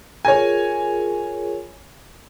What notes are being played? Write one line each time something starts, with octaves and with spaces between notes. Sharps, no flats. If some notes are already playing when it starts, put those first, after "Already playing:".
F4 G#4 A#4 C#5 G#5